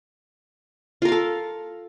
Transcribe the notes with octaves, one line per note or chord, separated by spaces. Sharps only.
F4 A4 A#4 F5